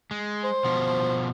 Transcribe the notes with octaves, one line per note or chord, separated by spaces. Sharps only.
G#3
C5
B2 F3